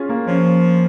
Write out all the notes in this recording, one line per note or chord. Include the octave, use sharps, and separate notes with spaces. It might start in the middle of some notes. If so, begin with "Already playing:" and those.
Already playing: C#4 F4 G#4
A#3
F3 C#4